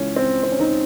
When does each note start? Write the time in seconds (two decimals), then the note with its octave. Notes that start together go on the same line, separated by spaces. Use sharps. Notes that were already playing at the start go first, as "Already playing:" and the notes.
Already playing: C#2 C#3 E3 C#4
0.16 C4
0.43 C4
0.52 C#4
0.60 C4 D#4